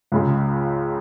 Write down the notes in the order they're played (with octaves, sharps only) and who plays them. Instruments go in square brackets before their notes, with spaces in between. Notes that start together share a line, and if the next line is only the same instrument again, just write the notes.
[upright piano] C#2 C#3 G#3